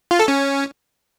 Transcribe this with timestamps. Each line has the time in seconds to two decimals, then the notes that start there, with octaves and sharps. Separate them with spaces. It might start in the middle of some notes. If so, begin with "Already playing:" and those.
0.11 F4
0.19 A4
0.28 C#4